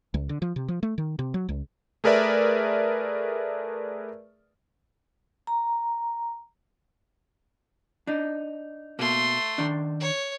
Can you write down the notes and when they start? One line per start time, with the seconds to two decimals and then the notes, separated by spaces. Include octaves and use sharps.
0.14 C#2
0.29 D3
0.42 F3
0.56 C3
0.68 F3
0.83 A3
0.98 D#3
1.19 C3
1.34 F#3
1.49 C#2
2.04 A3 G#4 A#4 B4 D5 E5
5.47 A#5
8.07 D4 D#4
8.99 B2 A3 A#3 C6
9.58 D#3 D4
10.00 C#5